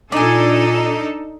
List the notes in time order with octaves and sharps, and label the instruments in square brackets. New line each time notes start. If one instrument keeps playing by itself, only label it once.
[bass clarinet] A#2 [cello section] D4 D#4 A4 [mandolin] D5 G#5